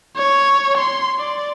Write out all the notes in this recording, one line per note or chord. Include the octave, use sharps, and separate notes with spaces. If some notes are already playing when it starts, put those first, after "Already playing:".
C#5
C6
D5